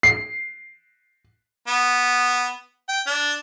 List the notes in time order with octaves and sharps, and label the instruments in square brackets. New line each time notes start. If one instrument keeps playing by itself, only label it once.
[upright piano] C7
[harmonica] B3
G5
D4